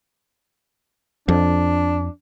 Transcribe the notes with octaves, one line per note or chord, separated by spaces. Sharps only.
F2 D4